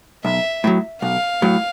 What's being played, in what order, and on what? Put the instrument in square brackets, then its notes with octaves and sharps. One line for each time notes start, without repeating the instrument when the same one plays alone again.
[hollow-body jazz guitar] B1 [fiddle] E5
[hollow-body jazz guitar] A2 F#3
[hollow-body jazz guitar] B1 [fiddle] F5
[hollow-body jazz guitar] A2 F#3